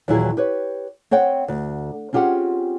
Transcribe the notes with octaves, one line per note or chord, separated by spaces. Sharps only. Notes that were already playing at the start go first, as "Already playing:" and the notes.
D#2 A#2 E3 F#3 E4 G#4
G4 B4 C#5
C4 C#5 F#5 G5
D2
C4 C#4 F4 G4 G#4 F#5